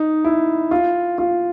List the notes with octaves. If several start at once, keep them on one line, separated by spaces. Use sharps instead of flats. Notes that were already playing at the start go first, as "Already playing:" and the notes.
Already playing: D#4
E4
F4
F4